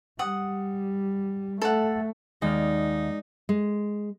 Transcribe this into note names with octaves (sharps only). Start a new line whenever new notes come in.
G3 F#5 D#6
A3 A4 F#5
D#2 G#3 D#4 D5 F6
G#3